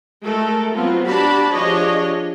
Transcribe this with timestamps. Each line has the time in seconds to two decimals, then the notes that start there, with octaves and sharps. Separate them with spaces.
0.23 G#3 A3 A4 A#4
0.73 F#3 B3 C4 F4
1.07 D4 F#4 G4 A5 B5
1.51 F3 D4 G4 G#4 C#5 D#5